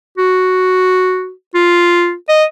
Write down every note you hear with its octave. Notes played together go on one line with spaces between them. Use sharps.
F#4
F4
D#5